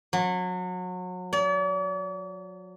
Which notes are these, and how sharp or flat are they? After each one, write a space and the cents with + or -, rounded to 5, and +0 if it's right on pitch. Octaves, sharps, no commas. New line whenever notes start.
F#3 -30
D5 -45